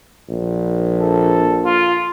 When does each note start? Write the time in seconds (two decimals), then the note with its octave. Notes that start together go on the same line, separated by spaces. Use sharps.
0.29 A#1
1.01 A4
1.65 F4